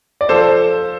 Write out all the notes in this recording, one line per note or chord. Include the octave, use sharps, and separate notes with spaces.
D5
F3 A4 C5